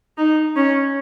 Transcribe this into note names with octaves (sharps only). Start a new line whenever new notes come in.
D#4
C#4